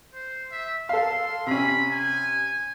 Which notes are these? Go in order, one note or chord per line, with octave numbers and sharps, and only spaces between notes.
C5
E5
A4 F5 C6
C3 C#4 B5
G#5